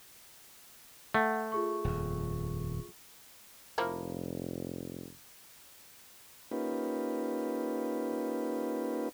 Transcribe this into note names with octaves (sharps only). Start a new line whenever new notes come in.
A3 F#5
F4 G#4 C#6
D#1 F2
F1 F3 A#3 E4
A#3 C#4 D#4 F4 G4 B4